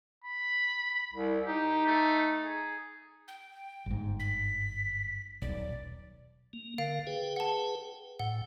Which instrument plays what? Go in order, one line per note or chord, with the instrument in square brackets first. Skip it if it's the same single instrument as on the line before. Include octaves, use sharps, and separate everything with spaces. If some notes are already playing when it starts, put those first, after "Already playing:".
[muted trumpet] B5
[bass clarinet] C2
[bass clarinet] D#4 [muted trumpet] G4
[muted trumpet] A3
G#4
[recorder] G5
[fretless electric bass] G1 G#2
[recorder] B6
[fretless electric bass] D#1 B1 [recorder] D5
[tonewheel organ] A#3
[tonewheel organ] D3 A#4 [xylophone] F5
[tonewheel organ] G#4 B4 G5
[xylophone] F#5 A5
[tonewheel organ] A2 G5 [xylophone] F#5